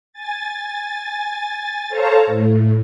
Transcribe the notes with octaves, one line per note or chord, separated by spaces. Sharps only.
G#5 A6
A4 C5 C#5 F5 A5 A#5
A2